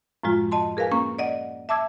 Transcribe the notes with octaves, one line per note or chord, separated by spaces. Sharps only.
F#2 A2 F3 G#3 F4
D#5 A5 C6
G#4 A#4 B4 F5 G#5
A#3 C#4 C#6
D5 D#5 F#5
E5 A5 D6 E6 G#6